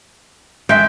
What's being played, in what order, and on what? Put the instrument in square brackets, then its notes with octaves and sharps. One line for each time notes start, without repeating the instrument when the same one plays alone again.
[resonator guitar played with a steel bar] G#3 E5 [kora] G5